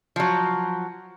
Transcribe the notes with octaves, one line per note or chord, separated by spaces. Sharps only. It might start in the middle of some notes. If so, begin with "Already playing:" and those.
F3 F#3